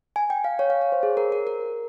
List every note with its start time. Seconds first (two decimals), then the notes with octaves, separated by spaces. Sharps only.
0.16 G#5
0.30 G5
0.44 F5
0.59 C#5
0.70 F5
0.81 C#5
0.92 C5
1.03 G#4
1.17 A#4
1.32 A#4
1.47 A#4